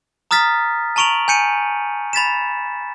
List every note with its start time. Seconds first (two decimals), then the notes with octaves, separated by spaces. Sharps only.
0.31 A#5 D#6 F6 A6 B6
0.96 A5 A#5 C#6 D7 F7 F#7
1.28 G#5 G6 C#7 D#7
2.13 B5 A6 B6 E7